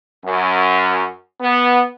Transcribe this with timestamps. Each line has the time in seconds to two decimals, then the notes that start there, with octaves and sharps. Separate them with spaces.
0.25 F#2
1.41 B3